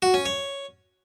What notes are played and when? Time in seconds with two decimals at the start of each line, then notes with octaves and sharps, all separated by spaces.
0.02 F#4
0.14 C#4
0.26 C#5